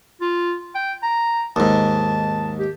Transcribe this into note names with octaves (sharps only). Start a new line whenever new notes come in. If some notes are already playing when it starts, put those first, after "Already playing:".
F4
G5
A#5
D#2 G#2 A5
G4